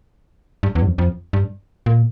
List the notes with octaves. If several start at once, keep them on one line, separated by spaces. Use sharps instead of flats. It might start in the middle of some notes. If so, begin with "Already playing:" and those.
G2
E2
G2
F2
F2
G2
A#2